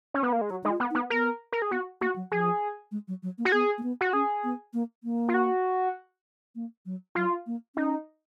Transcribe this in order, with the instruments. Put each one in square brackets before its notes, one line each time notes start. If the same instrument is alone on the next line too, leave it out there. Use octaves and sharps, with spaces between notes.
[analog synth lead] C#4
B3
A#3
G#3
[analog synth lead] F#3 [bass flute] F#4
[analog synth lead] G#3 [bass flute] D#4
[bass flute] F4
[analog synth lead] B3
[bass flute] D#4
[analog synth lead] B3
[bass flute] B3 [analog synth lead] A#4
[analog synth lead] A#4
G#4
[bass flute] B3 [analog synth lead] F#4
[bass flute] A#3 [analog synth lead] F#4
[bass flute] F#3
[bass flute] F3 [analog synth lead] G#4
[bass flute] G#3
F#3
F#3
A#3
[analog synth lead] F#4
[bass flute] B3 [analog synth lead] G#4
[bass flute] A#3
B3
[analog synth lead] F#4
[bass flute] C#4 [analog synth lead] G#4
[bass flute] B3
A#3
A#3
[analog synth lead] F4
F#4
[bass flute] A#3
F#3
[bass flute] F#3 [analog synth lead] F4
[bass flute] A#3
[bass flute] C#4 [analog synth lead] D#4